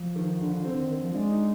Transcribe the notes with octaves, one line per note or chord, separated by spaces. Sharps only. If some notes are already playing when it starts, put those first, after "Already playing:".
Already playing: F3
D#3
D3
D3 C4
D#3
D#3
F3
G#3 D4
D#4